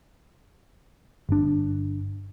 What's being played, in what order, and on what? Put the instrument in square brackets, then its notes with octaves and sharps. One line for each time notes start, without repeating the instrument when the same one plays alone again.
[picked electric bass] G1 D4